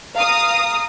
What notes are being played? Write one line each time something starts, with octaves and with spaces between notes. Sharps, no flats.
F5 A#5 D#6